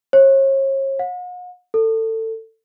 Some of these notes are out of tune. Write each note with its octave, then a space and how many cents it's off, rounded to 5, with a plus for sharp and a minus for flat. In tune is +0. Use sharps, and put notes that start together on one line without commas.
C#5 -40
F#5 -45
A4 +25